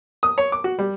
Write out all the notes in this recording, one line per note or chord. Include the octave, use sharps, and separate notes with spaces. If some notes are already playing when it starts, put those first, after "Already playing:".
D#6
C#5
D6
F#4
G3